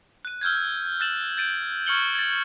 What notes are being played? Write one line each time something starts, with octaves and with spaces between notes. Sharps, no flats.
F#6 D#7
E6 F6 G6 G#6
E6 F#6 A6 E7 F#7
G6 A6 D7 D#7
C#6 F6 G#6 C#7 F#7 G7
G#6 A6